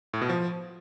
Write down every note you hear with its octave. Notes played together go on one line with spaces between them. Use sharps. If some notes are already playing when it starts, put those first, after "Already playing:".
A2
B2
F3